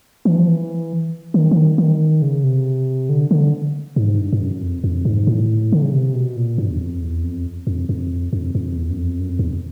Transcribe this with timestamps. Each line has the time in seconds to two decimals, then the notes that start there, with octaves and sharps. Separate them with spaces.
0.25 E3
0.36 F3
0.48 E3
1.34 D#3
1.51 E3
1.56 D#3
1.78 D#3
2.22 C#3
2.44 C3
3.09 D3
3.31 D3
3.96 G#2
4.18 G2
4.33 G2
4.40 F#2
4.62 F2
4.84 F2
5.05 G#2
5.27 A2
5.72 D3
5.82 C#3
5.93 C3
6.14 B2
6.36 A#2
6.58 G2
6.71 E2
6.80 F2
7.02 E2
7.24 F2
7.67 F2
7.89 F2
8.33 F2
8.55 F2
8.76 E2
8.91 F#2
8.98 F2
9.20 F#2
9.29 F2
9.39 E2